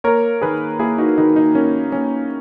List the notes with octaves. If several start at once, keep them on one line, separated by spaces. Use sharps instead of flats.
A#3 A#4 C#5
D#3 G#4 B4
A#3 E4 G#4
D#4 F#4
D#3 D#4
D#4
A#3 C#4
A#3 C#4